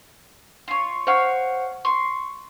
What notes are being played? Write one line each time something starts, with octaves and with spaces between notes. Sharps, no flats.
F4 C#5
C5 C#5 F5 F#5
C6 C#6